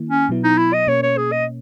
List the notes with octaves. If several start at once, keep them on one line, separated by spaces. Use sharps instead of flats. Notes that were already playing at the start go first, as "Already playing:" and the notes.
Already playing: D#3 A#3 E4
C#4
B2 F#3 B3 E4
D#4
E4
D#5
B2 A#3 C#4 C#5
C#5
G#4
D#5